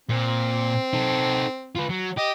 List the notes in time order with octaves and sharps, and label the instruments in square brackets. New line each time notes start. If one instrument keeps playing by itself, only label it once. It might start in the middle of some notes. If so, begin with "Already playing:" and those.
[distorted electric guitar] A#2 [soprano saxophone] C4
[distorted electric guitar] D#4 A4
F4 B4
F#3
[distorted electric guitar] G4 [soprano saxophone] D#5